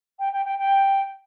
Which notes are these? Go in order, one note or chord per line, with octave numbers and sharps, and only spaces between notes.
G5
G5
G5
G5